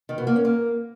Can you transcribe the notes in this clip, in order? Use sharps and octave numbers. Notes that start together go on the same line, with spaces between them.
D#3
B2
A#3
C#4
A#3